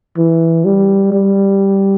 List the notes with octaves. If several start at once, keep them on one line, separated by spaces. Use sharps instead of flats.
E3
G3
G3